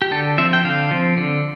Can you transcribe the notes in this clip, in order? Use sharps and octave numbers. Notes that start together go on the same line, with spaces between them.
G4
D3 A4
F3 C4 E5
G5
D3 F5
F3 C4
D3